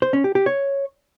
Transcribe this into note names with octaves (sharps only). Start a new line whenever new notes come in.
C5
C#4
G4
G4
C#5